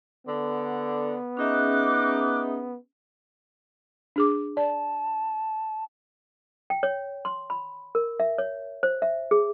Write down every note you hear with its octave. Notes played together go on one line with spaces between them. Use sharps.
D3 B3
C#4 D#4 G#4 E5 D6 F#6
D4 G#4 D6
D5 A5
G5
C#5
C6
B5
A#4
E5
C#5
C5
E5
G#4